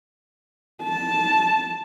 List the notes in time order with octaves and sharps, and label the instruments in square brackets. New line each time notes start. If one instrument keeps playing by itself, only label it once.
[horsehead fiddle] A5